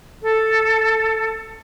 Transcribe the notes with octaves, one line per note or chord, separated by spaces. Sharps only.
A4